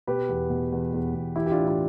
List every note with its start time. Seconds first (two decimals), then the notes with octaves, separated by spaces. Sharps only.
0.07 B2 G4 B4
0.29 E2
0.50 B2
0.72 E2
0.93 E2
1.14 E2
1.36 E3 E4 G4
1.46 G4
1.51 D4 F4
1.57 A2
1.68 E4